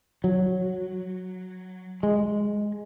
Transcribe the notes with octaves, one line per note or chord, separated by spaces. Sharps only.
F#3
G#3